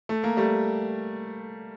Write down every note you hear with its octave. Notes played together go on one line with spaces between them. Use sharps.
A3
A#3
G3 A3